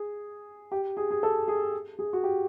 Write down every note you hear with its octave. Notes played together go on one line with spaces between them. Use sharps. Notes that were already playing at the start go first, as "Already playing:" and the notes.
Already playing: G#4
G4
G#4
G#4
A4
G#4
G#4
F#4
G4